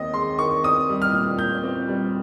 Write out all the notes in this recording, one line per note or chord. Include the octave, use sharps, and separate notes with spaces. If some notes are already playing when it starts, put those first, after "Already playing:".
Already playing: D#2 D#3 C4 D#5
G#3 C6
D#3 C#6
C4 D#6
G3
F6
A#2
A#2 G6
C4
G3